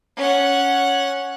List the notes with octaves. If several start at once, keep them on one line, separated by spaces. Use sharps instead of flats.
C#4 F#5